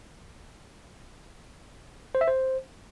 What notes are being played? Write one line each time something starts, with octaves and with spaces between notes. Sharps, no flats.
C5
E5
C5